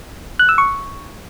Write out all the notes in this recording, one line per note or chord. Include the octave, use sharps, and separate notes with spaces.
F#6
E6
C#6